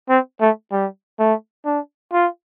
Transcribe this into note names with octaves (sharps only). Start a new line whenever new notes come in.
C4
A3
G3
A3
D4
F4